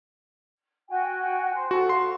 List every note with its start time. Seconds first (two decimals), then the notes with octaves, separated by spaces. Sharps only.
0.89 F#4 G5 G#5
1.54 C5
1.71 F#4 A4
1.89 F5 C6